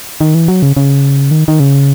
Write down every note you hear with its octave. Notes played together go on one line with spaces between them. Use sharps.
D#3
E3
F#3
C#3
C#3
D#3
D#3
C#3